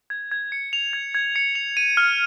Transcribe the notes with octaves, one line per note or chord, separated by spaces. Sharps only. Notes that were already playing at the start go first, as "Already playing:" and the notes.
G#6
G#6
C#7
F7
G#6
G#6
C#7
F7
D#7
F6